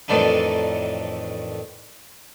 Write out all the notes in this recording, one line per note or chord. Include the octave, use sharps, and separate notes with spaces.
F2 A2 D#3 E3 D4 D#4